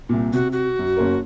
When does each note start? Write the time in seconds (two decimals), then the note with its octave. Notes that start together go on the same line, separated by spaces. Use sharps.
0.09 C2 A#2
0.33 C3 F#4
0.52 F#4
0.79 F#2
0.97 F#1 C#4 A#4